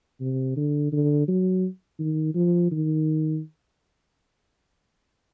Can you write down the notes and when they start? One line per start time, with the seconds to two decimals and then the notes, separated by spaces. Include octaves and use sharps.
0.21 C3
0.57 D3
0.93 D3
1.28 F#3
2.00 D#3
2.35 F3
2.72 D#3